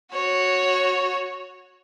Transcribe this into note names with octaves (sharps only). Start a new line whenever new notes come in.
F#4 C#5